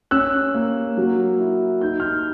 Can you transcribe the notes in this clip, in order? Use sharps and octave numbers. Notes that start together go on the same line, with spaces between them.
C#4 E6 F#6
A#3
F#3
E4
D#4 G6
F6 G6